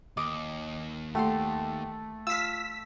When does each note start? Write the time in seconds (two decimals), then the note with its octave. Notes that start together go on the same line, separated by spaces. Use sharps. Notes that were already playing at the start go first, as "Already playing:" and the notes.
0.17 D#2 D#5 D6
1.15 A3 G4 F#5 C6
2.27 F4 F5 E6 B6